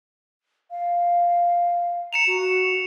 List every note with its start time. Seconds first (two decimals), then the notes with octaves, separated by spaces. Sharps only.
0.70 F5
2.13 A#5 C#7 E7 F7
2.27 F#4